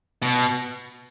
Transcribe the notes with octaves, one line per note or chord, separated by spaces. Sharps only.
B2